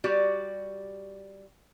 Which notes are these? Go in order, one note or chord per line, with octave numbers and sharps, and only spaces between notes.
G3 F#4 D5